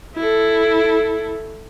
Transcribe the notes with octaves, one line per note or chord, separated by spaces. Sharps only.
E4 A4